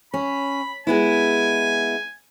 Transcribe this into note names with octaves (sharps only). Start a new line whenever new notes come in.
C#4 B5
G#3 B3 E4 G#5